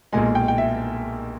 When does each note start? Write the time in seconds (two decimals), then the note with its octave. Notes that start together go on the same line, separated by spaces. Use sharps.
0.13 B1 A#2 G#3 G#5
0.35 G5
0.48 G5
0.58 E5